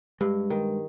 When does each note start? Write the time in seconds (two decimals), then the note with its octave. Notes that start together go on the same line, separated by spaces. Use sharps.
0.20 G2 G#3
0.50 D#3